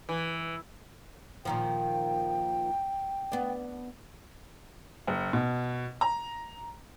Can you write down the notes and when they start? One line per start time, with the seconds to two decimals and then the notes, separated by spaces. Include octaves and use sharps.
0.09 E3
1.45 A#2 D#3 F3 G5
3.32 B3 D4
5.07 F#1
5.33 B2
6.01 A#5